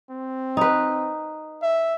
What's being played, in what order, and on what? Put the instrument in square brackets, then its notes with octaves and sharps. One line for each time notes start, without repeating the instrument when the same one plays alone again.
[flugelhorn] C4
[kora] D#4 B4
[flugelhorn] E5